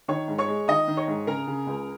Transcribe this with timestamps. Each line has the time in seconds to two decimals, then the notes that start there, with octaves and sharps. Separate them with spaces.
0.08 D#3 C#5 C#6
0.28 G#2
0.38 C#5 C#6
0.48 G#3
0.68 D#3 D#5 D#6
0.88 D#3
0.97 C#5 C#6
1.08 G#2
1.27 C#3 A#4 A#5
1.47 C#3
1.67 C#2